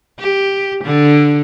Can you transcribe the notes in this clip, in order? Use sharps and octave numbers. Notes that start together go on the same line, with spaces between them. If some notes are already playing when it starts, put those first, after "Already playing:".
G4
D3